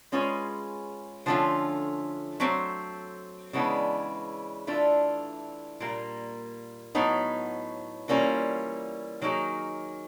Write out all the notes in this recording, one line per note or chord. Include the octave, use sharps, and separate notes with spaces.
G#3 C#4 F4 G#4 B4
D3 F3 A3 C#4 F4
F#3 A3 C4
C#3 E3 G#3 B3 D4
E3 A3 D4 F4
A#2 G3 A#3
A2 F#3 B3 D#4
E3 G3 A#3 C#4 F4
D#3 F#3 A#3 D#4 G#4